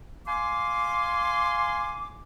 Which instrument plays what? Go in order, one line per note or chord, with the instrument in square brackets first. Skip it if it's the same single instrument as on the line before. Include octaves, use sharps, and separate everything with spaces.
[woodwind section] F5 G#5 C6 D6